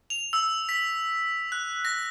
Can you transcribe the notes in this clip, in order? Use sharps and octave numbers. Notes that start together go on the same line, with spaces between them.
F7
E6
B6
F#6
A#6